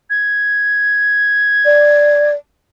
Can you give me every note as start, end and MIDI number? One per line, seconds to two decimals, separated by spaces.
0.10 2.29 92
1.65 2.34 74